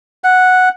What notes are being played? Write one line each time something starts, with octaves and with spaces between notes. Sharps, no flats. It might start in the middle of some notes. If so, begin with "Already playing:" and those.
F#5